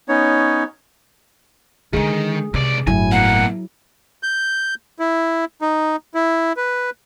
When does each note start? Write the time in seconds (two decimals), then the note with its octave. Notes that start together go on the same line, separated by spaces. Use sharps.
0.09 B3 C#4 D#4 C#5
1.93 D3 D#3 G#3 G#4
2.54 C#2 C3 D5
2.87 G1 A2 F#3 E4 G#5
3.12 B2 A#3 F#5
4.23 G6
4.99 E4
5.62 D#4
6.14 E4
6.57 B4